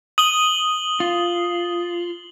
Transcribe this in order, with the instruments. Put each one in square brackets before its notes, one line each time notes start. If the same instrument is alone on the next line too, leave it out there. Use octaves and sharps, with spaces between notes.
[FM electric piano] D#6 [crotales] F#7 G7
[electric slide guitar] F4